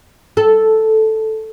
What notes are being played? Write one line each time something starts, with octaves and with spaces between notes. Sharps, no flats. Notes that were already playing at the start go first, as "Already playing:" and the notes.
A4